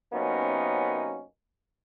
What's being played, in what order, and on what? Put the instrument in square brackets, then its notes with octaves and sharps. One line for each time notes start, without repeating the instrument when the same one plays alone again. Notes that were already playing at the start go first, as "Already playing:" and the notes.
[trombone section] F#2 C3 A#3 B3 C#4 D#4